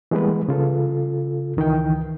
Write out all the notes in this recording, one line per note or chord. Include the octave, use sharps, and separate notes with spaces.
E3 G3 G#3 A#3 B3 B4
C#3 F4 A4
C#2 D#3 E3 G5